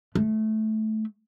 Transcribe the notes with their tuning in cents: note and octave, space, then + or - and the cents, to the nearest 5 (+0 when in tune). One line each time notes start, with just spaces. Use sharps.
A3 -15